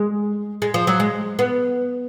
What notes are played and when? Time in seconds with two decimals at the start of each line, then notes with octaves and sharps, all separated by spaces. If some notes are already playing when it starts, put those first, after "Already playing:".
Already playing: G#3
0.62 G#3
0.74 F3
0.87 F#3
1.00 G#3
1.39 B3